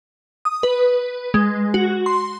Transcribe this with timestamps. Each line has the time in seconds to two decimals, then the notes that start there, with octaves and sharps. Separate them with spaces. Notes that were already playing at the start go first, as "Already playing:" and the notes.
0.45 D#6
0.63 B4
1.34 G#3
1.74 F#4
2.06 C6